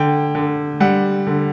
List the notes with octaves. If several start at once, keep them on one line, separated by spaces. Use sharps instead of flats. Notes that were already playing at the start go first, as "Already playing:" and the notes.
Already playing: D3 G5
D3
G3 F#5
D3